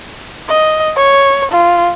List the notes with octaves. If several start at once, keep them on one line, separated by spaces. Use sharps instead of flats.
D#5
C#5
F4